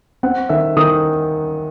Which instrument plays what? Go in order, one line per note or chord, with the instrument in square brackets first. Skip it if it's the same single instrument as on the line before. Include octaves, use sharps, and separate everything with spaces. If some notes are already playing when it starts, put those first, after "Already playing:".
[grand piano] C4 F#5
D#3 E5
D#3 D#6